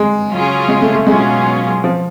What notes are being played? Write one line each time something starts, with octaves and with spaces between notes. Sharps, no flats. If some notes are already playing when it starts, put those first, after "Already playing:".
Already playing: G#3
C#3 F#3 C#4 F4 G#4
G#3
A3
A3
B2 F#3 G#3 C#4 F4 G#4
F3